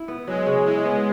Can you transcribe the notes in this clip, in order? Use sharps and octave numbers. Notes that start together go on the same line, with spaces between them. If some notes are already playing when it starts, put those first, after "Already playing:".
Already playing: E4
B3
F#3 G#3
C#3
G#3 E4
B3